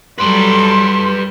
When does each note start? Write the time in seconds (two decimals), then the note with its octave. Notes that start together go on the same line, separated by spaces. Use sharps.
0.18 F#3 G3 A4 B4 D5 C6